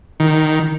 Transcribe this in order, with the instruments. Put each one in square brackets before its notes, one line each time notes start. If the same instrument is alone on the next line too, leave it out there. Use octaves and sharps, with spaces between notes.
[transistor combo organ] D#3